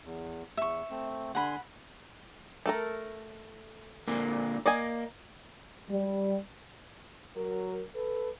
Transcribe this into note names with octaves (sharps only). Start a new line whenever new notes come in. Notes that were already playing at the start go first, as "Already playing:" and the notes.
E2
E2 E5 C#6
A3 C4
D3 F#5 G#5 B5 C6
A3 A4 A#4
A#2 D3 A#3
A#3 D5 D#5 G#5
G3
F#3 A#4
A4 B4